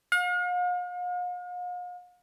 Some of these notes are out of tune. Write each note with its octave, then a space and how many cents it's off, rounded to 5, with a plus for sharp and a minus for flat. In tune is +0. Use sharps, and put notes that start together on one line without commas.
F5 +45